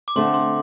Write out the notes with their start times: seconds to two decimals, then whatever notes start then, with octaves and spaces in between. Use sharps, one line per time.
0.08 D6
0.16 D3 A3 C4 C6
0.34 C6